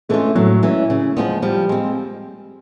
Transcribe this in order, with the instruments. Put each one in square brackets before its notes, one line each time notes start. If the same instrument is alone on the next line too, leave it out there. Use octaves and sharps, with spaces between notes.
[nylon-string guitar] E3 A3 C#4 F4 [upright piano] G#3
[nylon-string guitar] A2 [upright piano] F#3
[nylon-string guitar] E3 G#3 C#4
C#3
F3 G#3 B3
[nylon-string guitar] F3 [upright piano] G3
[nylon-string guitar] G#3 C4